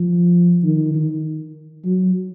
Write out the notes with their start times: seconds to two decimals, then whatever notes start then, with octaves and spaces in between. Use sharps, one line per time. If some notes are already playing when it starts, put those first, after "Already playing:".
Already playing: F3
0.64 D#3
0.94 D#3
1.85 F#3